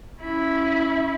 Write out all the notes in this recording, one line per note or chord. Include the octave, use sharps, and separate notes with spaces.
C#4 E4